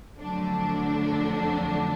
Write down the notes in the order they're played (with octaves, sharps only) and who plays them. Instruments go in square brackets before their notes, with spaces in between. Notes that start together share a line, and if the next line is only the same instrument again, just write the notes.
[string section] F2 D3 F#3 A3 D4